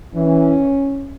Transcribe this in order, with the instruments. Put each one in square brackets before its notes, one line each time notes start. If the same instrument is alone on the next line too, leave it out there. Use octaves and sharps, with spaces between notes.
[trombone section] E3 [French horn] C#4